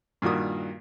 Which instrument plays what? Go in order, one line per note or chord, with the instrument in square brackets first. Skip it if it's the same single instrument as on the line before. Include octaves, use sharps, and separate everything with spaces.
[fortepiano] G2 A#2 D#3 F#4 D#6